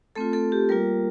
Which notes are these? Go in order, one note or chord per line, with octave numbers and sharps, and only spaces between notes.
A3 C4 F4 A4
A4
G4
G3 A#3 F4 A#4